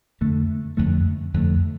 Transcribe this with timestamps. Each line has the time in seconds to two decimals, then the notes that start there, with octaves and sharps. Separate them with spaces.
0.21 F2 D3 A3
0.77 F2 D3 A3
1.34 F2 D3 A3